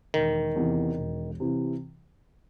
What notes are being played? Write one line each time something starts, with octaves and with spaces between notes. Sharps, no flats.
E1 D#3
E2 C3 E3
E1
C3 E3